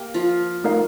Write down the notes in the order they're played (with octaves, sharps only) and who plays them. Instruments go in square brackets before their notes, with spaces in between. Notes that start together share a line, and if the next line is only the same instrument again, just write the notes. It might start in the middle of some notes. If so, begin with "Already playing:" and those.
Already playing: [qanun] A#3 [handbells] G4 G5
[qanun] F3 F4
[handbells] A3 D#4 A#4 D5 F5